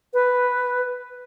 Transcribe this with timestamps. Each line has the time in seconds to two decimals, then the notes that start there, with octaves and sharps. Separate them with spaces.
0.14 B4